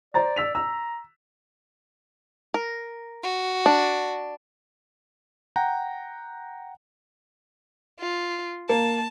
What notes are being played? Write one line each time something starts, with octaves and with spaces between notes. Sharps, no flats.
C5 D5 A#5 A6
E6 B6 F7
A#5 E6
A#4
F#4
D4
F#5 G5 A#5
F4
A#3 A5